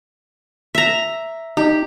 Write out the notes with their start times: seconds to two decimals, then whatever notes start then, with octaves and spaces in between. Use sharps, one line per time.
0.75 E5 A#5
1.57 D#4 G4